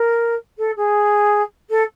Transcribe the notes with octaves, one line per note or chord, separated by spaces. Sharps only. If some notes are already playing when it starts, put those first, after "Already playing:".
Already playing: A#4
A4
G#4
A4